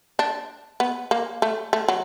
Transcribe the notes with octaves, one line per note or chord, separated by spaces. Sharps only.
D4
B3
A#3
A3
A3
F#3